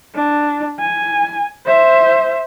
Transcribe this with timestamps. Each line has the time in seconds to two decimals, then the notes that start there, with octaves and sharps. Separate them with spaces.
0.15 D4
0.79 G#5
1.66 C5 E5